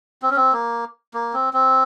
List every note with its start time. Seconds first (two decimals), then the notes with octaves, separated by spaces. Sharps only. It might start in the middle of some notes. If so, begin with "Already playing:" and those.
0.22 C4
0.30 C#4
0.37 C4
0.53 A#3
1.14 A#3
1.34 C4
1.53 C4